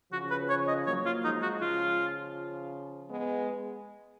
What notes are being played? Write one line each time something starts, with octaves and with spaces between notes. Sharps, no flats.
C#3 F3 F#4
B4
C#5
D#5
F#3 A#3 C#5
F4
F3 G#3 D#4
F#4
C#3 F3 F4
G#3 B3